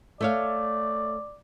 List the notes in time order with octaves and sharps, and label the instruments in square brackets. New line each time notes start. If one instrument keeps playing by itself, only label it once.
[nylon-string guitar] A3 C#5 F5 [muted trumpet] D5